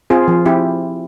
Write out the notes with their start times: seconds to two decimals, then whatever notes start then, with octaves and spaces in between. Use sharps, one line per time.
0.10 C4 F4 G#4
0.28 F3
0.46 C4 E4 G4